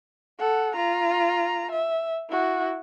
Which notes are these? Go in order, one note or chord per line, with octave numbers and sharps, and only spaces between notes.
A4 F#5
F4 A#5
E5
E4 F#4